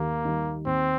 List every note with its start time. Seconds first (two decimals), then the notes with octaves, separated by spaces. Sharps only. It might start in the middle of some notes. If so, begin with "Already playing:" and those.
Already playing: D#2 D#3 G3 A#3
0.25 D#3 G3 D#4
0.65 D#2 C4